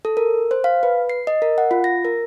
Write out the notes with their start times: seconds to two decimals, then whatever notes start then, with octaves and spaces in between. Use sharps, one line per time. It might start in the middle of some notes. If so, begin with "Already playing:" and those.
0.05 A4
0.17 A#4
0.51 C5
0.64 F5
0.83 B4
1.10 C7
1.27 D#5
1.42 A#4
1.58 F#5
1.71 F4
1.84 A#6
2.05 A#4